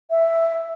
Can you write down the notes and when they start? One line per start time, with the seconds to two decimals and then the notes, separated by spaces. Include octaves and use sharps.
0.10 E5